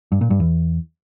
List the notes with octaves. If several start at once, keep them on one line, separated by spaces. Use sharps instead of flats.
G2
A#2
G2
E2